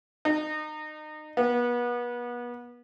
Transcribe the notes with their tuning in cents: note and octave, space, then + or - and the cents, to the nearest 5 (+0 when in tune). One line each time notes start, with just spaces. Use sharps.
D#4 -25
B3 -35